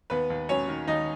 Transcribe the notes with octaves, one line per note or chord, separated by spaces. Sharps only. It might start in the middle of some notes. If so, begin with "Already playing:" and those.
D#2 B3 B4
D#2
F#3 C#4 C#5
D#3
D#2 D#4 D#5